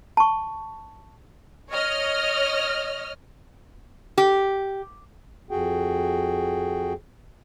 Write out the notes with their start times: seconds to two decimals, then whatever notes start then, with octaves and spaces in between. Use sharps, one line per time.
0.17 A5 C#6
1.70 C#5 D#5 F6
4.18 G4
5.51 F2 F#4 G#4 G5